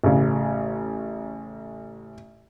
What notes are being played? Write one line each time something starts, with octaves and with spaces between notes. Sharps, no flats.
A1 C#3